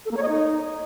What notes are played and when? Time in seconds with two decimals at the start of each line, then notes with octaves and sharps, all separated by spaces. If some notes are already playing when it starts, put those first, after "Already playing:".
0.05 A4
0.11 A#3
0.17 C#5
0.22 D#5
0.28 D#4